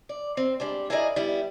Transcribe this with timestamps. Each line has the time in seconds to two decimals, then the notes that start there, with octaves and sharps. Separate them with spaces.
0.09 D5
0.37 C4
0.60 G3 G#3 D4
0.90 E4 G#4 A#4 B4 D5 D#5
1.16 G3 B3 E4